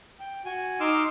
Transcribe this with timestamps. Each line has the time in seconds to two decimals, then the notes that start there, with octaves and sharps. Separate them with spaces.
0.20 G5
0.45 F#4 G#5
0.80 D#4 C6 D6 E6 F6